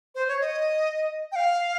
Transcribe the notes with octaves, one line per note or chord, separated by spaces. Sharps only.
C5
C#5
D#5
G5
F5